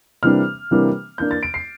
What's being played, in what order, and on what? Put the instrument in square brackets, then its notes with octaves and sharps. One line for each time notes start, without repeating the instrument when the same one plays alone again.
[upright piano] C3 E3 G3 A#3 D4 F6
C3 E3 G3 A#3 D4
E3 A#3 D4 G6
A6
D7
C7